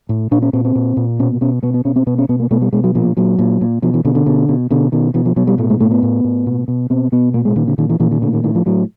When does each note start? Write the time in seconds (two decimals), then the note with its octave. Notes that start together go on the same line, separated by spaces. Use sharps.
0.09 A2
0.31 A#2 D4
0.42 C#4
0.53 A#2 C4
0.65 C4
0.75 A#2
0.97 A#2
1.19 B2 C#4
1.41 B2 C#4
1.63 B2 B3
1.74 B3
1.85 B2 C#4
1.96 C4
2.07 B2 B3
2.18 C#4
2.29 B2 B3
2.40 A#3
2.51 B2 A3
2.61 G3
2.73 B2 G#3
2.84 F#3
2.95 A#2 F3
3.17 A#2 F#3
3.39 A#2
3.61 A#2
3.82 B2 F3
3.94 E3
4.05 B2 D3
4.15 D3
4.26 B2
4.49 B2
4.71 B2 D3
4.92 B2 D#3
5.14 B2 E3
5.25 F3
5.36 B2 F#3
5.47 G3
5.58 A2 A3
5.70 G#3
5.80 A2 A3
5.91 B3
6.03 A2
6.24 A2
6.46 B2
6.68 B2
6.90 B2 C4
7.12 B2 B3
7.34 A#2 A#3
7.45 G#3
7.56 A#2 D#3
7.68 D3
7.78 A#2 D#3
7.89 E3
8.00 A#2 E3
8.11 D#3
8.22 A2 D3
8.33 D#3
8.44 A2 D#3
8.55 F3
8.66 A2 F#3